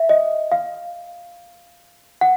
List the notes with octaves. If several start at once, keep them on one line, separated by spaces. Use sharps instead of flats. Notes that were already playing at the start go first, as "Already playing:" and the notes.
Already playing: E5
D#5
F5
F#5